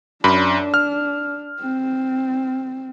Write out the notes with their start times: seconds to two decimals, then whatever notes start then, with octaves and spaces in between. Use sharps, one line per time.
0.24 F#2 D4 B5
0.74 F6
1.60 C4